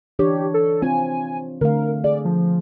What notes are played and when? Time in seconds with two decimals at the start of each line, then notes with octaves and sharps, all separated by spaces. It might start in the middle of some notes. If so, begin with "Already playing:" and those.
0.19 E3 D4 G4 C#5
0.54 A4
0.82 C4 F4 C5 G#5
1.61 D3 A3 A#4 F5
2.04 G#4 D5
2.25 F3